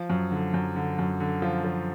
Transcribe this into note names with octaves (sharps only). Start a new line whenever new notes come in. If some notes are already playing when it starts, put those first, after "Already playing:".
Already playing: F3
F#2
D3
F#2
D3
F#2
D3
F3
F3